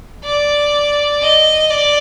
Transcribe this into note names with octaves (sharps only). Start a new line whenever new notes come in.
D5
D#5
D5